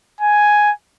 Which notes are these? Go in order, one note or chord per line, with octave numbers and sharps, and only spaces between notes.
G#5